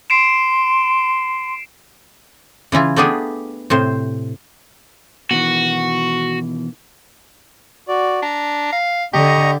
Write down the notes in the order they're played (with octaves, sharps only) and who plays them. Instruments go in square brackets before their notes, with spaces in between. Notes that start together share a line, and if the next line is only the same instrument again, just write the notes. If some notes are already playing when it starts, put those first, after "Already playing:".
[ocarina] C6 [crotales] C7 D7 E7
[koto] C#3 E3 E4 F4
A3 B3 D4 G4 G#4
A2 C3 C5
[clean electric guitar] B2 D#3 E3 [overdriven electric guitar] F#4
[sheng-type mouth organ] F#4 D5
[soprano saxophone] D4 [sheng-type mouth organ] A#5
[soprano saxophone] F5
[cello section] D3 [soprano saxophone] G4 [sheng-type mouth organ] D#5 A#5 C#6